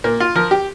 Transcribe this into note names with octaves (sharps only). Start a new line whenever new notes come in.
A#2 A#3
F4
F3 A#4
G4